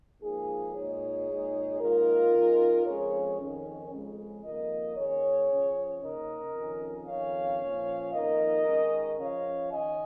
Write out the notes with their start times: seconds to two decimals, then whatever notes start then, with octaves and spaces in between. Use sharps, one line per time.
0.22 G#2 F3 A#3 D#4 G#4
0.74 A#2 G#3 D#4 G#4 C#5
1.28 A#2 G#3 D#4
1.80 G#2 D#3 A#3 D#4 F4 A#4
2.32 C#3 G#3 D#4
2.86 F2 C#3 F3 G#3 C#4 G#4 C#5
3.38 F2 D#3 C#4
3.91 F2 C#3 G#3
4.44 F2 D#3 A#3 A#4 D#5
4.96 D#3 A#3 C#4 G#4 C#5
5.50 C#3 F3 C#4
6.02 C#3 A#3 D#4 A#4 D#5
6.55 F2 D#3 C#4
7.07 F2 D#3 C#4 C#5 F5
7.60 A#2 F3 C#4
8.13 F2 D#3 A#3 D#4 A#4 D#5
8.66 D#3 G#3 C#4
9.19 C#3 F3 C#4 C#5 F5
9.72 D#3 C#4 D#5 G#5